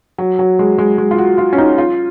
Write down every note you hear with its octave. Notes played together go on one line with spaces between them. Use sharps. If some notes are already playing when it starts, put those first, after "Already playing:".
F#3
F#3
G#3
G#3
G#3
F4
F#4
F4
C#4
D#4
F4